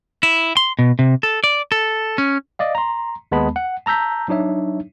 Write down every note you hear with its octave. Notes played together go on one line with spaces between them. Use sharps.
E4
C6
B2
C3
A4
D5
A4
C#4
D5 D#5 F5
A#5 C6
D#2 G#3 B3 A5 B5
F#5
A5 A#5 E6 G6 B6
F#3 D4 D#4 C#5 E5